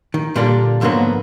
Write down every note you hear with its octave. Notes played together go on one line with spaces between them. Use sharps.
D#3
A#2 D3 G3 A#3 D4 F4
F2 G#2 D3 F#3 A#3 B3